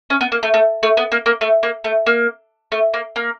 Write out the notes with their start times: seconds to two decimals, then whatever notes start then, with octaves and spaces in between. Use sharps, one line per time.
0.10 C#4
0.21 B3
0.32 A#3
0.43 A3
0.54 A3
0.83 A3
0.97 B3
1.12 A#3
1.26 A#3
1.41 A3
1.63 A#3
1.84 A3
2.06 A#3
2.72 A3
2.94 A#3
3.16 A#3